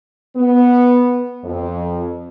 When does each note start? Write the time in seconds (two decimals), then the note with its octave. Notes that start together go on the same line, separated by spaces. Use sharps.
0.36 B3
1.44 F2